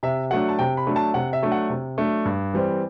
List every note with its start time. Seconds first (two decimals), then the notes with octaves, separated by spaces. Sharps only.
0.03 C3 E5
0.31 F#3 A3 D4 F#5
0.49 A5
0.59 C3 G5
0.77 B5
0.87 F#3 A3 D4
0.96 A5
1.14 C3 F#5
1.33 E5
1.42 F#3 A3 D4
1.52 F#5
1.70 C3
1.98 F#3 A3 D4
2.25 G2
2.54 E3 G3 C4